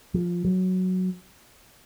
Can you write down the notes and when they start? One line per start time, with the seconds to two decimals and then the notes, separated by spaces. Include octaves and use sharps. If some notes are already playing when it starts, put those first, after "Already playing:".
0.14 F3
0.45 F#3